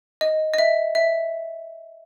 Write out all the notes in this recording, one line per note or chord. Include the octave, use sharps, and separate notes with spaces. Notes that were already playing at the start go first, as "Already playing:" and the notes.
D#5
D#5
E5
E5